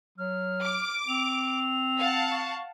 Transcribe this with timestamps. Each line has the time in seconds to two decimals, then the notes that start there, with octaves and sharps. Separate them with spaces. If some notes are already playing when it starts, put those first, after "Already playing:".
0.18 F#3 F6
0.62 D6
1.08 C4 F7
1.99 F5 F#5 A5
2.31 C#6